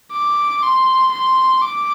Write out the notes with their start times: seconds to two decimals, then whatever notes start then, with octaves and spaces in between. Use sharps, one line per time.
0.12 D6
0.62 C6
1.12 C6
1.62 D6